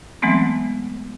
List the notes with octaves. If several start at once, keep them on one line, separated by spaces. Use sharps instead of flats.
E3 F#3 G#3 A3 B3 C4